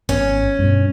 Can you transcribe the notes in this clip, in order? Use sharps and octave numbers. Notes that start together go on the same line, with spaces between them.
G#1 B3 C#4
G2 B2